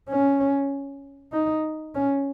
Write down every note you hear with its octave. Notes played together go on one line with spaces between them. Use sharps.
C#4
D#4
C#4